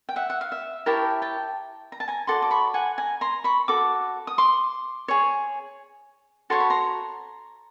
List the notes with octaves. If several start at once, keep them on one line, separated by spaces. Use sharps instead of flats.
G5
E5 F#5
F#5
F5
E5
E4 G4 A#4 C#5 G5 A5
G5 A5
A#5
A5
G#5 A#5
F#4 A4 D5 C6 D6
D6
B5 C#6
F#5 G#5
G#5 A#5
A#5 C6
B5 C#6
F#4 A4 D6
D#6
C6 D6
G#4 C#5
F#4 A4 C#5 C6
B5
A#5 C6